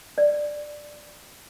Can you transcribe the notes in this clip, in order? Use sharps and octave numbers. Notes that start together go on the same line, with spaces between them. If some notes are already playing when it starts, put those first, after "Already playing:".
D5